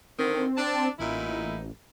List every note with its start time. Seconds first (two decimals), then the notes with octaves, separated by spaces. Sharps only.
0.19 D3 D#3 C4
0.57 D4 A5
0.99 A1 A#2 D#4 E4